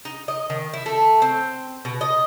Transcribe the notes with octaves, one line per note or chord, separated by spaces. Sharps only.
D#4
D#5
D#3
E4
A3
C4
B2
D#5